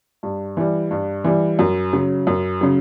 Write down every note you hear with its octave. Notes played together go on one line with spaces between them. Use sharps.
G2
E3 G3
G2
E3 G3
F#2
C#3 F#3
F#2
C#3 F#3